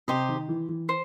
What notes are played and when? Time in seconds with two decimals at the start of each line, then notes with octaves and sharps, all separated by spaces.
0.08 C3 G4 C5 D#5
0.29 D#3
0.49 E3
0.69 E3
0.89 C5